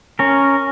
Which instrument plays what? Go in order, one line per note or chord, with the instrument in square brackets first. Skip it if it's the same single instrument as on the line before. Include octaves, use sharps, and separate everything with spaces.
[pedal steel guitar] C#4 A#4